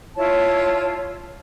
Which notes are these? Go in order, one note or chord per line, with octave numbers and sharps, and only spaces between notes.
E4 F4 C#5 A5